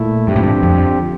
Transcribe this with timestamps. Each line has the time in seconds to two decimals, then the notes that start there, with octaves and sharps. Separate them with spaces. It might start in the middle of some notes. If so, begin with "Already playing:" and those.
Already playing: A#2 A3 E4
0.28 G2 D3 F3 C4 G4
0.36 A2
0.43 G2
0.63 F2